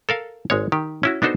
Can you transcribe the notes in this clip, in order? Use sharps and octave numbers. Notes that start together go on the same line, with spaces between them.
A4 A#4 F5
G#1 G#3 C#5
D#3 G4
C#4 E4 F#4
B3 D4 D#4 F#4 A4 C5